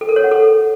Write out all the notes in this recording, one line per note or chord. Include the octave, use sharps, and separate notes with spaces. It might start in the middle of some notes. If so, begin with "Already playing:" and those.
A4
A#4
C#5
F#5
A4